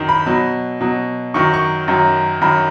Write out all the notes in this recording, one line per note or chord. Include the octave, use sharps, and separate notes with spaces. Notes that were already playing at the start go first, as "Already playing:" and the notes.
Already playing: F#2 D#3
B5
B2 F#3
B2 F#3
F#2 D#3 F#3 C#6
C#6
F#2 D#3 F#3
F#2 D#3 F#3 B5